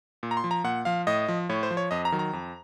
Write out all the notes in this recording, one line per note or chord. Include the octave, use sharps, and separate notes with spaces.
A#2
A#5
C6
F3
A#5
A#2 F#5
F3 F5
A2 D#5
F3
A2 C#5
C5
F3
C#5
F2 D#5
A#5
D#3 F#3
A#5
F2